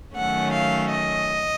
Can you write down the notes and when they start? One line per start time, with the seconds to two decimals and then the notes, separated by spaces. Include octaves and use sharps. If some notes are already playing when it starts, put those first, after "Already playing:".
0.16 D#3 F#3 A3 C#4 F#5
0.54 F5
0.91 D#5